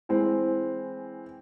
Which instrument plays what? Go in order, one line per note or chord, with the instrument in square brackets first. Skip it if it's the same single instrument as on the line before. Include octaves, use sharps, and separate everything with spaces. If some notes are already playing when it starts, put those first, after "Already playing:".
[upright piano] E3 G#3 C4